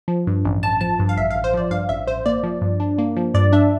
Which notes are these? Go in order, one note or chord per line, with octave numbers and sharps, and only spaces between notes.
F3
G2
A1
A1 A5
F3 A5
G2
F5
A1 E5
F5
A1
C5
F3 D5
G2 F5
A1 E5
A1 C5
A#3 D5
F3
G2
D4
A#3
F3
G2 D5
D4 E5